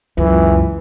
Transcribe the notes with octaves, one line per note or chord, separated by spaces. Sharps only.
C#2 F#2 E3